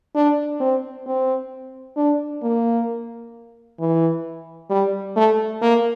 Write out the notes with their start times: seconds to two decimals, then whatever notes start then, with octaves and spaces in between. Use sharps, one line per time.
0.15 D4
0.60 C4
1.06 C4
1.97 D4
2.43 A#3
3.80 E3
4.70 G3
5.16 A3
5.61 A#3